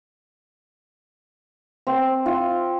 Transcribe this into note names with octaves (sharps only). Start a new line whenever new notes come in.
C4
F4